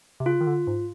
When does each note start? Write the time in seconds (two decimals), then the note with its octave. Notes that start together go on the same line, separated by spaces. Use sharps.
0.20 C3
0.26 C#3 F4
0.41 D#3
0.47 D3
0.67 G#2